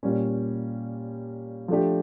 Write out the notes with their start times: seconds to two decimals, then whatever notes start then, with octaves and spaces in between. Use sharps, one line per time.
0.03 A#2 G3 C#4
1.68 F3 A3 D4 G4